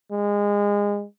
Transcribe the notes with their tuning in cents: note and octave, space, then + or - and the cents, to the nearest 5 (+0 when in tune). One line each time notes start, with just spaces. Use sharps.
G#3 -25